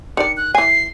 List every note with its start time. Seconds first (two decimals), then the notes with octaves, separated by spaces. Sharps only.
0.17 D#3 D4 D5 C#7
0.37 F#6
0.55 E3 G#5 C7